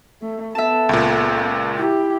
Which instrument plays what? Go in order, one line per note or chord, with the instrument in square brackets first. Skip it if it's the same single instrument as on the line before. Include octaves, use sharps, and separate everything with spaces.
[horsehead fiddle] A3
[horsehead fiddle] B3 A4 [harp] E5 A5
[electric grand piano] C#2 A#2
[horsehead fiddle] E4 G4